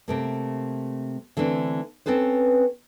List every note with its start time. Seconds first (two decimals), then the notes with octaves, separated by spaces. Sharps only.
0.08 C3 A3 A#3
1.37 D3 E3 A3 C4 D4
2.06 C4 C#4 A4 B4 C5